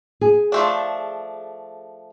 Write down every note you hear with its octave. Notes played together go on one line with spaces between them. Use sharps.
G#4
F3 A3 D4